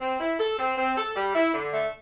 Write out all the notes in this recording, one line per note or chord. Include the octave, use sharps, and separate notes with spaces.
C4
E4
A4
C4
C4
A4
G3
E4
D3
A3